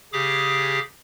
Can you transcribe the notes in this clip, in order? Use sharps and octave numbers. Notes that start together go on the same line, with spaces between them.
C#3 G4 G#4 D6